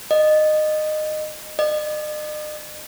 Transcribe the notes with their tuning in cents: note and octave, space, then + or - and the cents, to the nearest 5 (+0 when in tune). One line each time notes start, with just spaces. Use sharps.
D#5 -20
D#5 -45